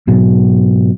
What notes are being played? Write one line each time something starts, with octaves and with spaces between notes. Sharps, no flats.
G#2 B2 F#3